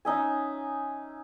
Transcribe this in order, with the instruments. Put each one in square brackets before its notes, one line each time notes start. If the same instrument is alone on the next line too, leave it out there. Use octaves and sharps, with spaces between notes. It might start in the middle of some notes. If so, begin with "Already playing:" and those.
[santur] C#4 D#4 E5 G#5